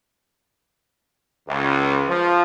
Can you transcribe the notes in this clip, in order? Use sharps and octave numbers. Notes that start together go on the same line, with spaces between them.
C#2
F3